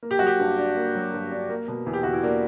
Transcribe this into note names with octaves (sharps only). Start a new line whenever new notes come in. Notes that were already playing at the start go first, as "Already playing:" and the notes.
A#3
G4
F#3 F#4
G4
G2
D4
A#3
F#3
G2
D4
A#3
B2
E2
G4
E2 F#4
E4
A#3 D4